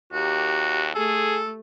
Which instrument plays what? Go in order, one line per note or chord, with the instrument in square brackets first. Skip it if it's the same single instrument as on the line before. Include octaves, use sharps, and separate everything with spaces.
[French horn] D#2 [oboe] F#4 [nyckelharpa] G4 A#4
[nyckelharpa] A3 [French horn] G#4 [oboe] A4